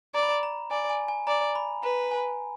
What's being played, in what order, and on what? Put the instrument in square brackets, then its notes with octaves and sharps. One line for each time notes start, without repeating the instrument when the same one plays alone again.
[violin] D5 [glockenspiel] A#5
[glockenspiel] B5
A#5
A#5
[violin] D5 [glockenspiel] G#5
[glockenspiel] G#5
G#5
[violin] D5 [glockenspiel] A#5
[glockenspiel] B5
[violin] B4 [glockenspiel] A#5
[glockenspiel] G#5